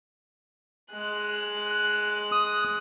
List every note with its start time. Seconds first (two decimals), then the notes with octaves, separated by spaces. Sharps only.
0.91 G#3 F#6
2.32 D#6